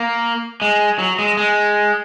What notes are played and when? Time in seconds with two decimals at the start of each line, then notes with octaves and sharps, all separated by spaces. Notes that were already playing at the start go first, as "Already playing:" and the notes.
Already playing: A#3
0.62 G#3
0.99 F#3
1.19 G#3
1.37 G#3